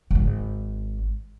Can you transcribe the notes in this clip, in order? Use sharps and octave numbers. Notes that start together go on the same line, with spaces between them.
D#1 G#1